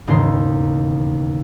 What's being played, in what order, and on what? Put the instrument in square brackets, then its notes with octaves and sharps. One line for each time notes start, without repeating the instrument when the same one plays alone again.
[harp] E1 D#2 G#2 C#3 A#5 C6